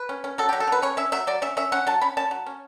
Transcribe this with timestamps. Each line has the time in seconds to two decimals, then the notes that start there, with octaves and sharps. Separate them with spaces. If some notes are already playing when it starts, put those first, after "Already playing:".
Already playing: B4
0.09 C#4
0.24 C#4
0.38 F#3 A4
0.49 F#3 G4
0.60 A4
0.67 F#3 B4
0.82 C#4 C#5
0.97 C#4 E5
1.12 F#3 E5
1.27 F#3 D5
1.42 C#4 E5
1.57 C#4 E5
1.72 C#4 F#5
1.87 F#3 A5
2.01 C#4 B5
2.17 C#4 A5
2.31 F#3
2.46 C#4